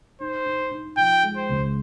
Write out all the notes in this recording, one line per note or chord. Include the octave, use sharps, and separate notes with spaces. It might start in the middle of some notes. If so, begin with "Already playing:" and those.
D#4 C5
D#4
D#4
F3 G5
G#3
C5
C#2